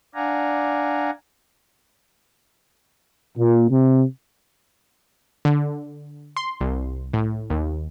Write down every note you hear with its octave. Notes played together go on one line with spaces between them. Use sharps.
D4 D5 F5 F#5 G#5 A#5
A#2
C3
D3
C6
C2
A2
D#2